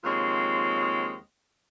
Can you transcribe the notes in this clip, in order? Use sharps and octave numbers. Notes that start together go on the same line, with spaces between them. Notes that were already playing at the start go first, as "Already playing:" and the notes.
D#2 F3 G#3 C4 C#5